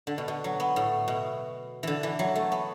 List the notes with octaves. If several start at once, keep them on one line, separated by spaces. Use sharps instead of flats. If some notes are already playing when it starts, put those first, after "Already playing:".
D3
B2
B2
F#3
B3
A2
B2
D3 E3
E3
F#3
A3
B3